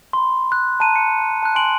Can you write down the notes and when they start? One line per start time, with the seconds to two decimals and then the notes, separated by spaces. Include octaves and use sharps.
0.13 B5 C6
0.52 F#6
0.80 A5 A#5 F#6 D#7
0.96 C#7
1.43 A5 F#6
1.55 G#5 C6 D7 F#7